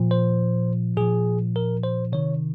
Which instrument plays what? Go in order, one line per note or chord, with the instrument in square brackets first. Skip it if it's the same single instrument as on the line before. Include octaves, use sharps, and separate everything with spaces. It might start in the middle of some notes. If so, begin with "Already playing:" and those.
Already playing: [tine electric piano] A#2 F3
C5
A#2 F3 G#4
A#4
C5
C3 D#3 C#5